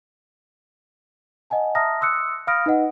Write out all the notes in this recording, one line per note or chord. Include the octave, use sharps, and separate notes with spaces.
D#5 F#5 G#5 A5
E5 A5 A#5 D#6 F6 A#6
C6 D#6 E6 F#6 C#7
F5 B5 D#6 F6 A#6 D7
D#4 B4 D#5 F#5